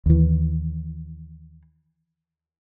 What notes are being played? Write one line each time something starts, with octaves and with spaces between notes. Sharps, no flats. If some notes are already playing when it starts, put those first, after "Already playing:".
D#2 E3